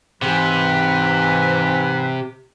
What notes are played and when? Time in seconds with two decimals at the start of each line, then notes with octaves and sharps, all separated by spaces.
0.22 G#2 C3 E3 B4